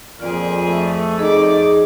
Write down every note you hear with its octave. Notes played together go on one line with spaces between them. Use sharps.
F2 A#2 F4 G#4 D5
A3
F2 D#4 G#4 D5